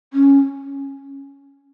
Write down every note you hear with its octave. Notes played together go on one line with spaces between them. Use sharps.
C#4